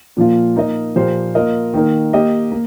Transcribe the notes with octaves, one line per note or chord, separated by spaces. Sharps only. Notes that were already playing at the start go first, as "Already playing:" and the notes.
A#2 F3 A#3 F4
A#3 D#4 A#4 D#5
A#2 F3 A#3 G4 C5
A#3 F4 A#4 D#5
D#3 A#3 D#4 A#4
A#3 G4 D#5
A#3